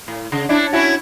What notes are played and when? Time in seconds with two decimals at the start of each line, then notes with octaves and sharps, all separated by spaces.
0.08 A2
0.32 C#3
0.49 C#4 D4 E4
0.73 C#4 E4 F#4